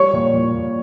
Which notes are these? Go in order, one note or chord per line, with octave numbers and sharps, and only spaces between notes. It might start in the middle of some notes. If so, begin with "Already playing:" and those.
Already playing: G3 C#5 C#6
A#2
A#2
A#2